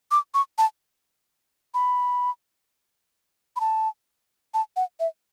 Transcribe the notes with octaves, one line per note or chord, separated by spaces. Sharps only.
D6
C#6
A5
B5
B5
A5
A5
F#5
E5